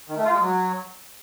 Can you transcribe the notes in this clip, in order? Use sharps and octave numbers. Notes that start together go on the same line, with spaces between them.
D#3
A3
F4
G#3
F#3